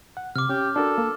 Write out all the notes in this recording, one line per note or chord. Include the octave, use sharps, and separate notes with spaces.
F#5
C3 D6 F6
C#4 G4
D4 F#4 A4 A#4
A#3